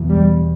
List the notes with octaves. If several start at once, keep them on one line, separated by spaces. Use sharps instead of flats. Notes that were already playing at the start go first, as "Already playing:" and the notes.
Already playing: E2 B2
G3